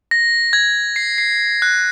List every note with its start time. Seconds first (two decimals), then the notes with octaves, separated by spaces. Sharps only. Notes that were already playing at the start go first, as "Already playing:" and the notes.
0.11 A#6
0.53 G#6
0.96 C7
1.18 C7
1.62 F#6